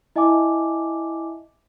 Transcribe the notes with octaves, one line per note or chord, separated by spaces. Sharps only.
E4 D#5 E5 G#5 A5 D6